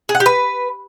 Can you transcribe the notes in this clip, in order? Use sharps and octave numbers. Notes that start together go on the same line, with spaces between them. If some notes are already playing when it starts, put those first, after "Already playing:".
G#4
F#5
G4
B4